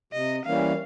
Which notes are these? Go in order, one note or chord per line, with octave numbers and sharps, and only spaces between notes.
C3 D#5
E3 G3 A#3 C#4 F5